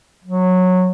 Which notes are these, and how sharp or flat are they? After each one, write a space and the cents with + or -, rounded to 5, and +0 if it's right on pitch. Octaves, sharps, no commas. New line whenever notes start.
F#3 -15